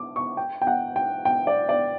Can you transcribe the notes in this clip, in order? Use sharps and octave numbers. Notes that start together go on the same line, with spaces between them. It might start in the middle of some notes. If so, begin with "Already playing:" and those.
Already playing: D6
C#6
G5
G5
F#5
G5
G5
D5
D5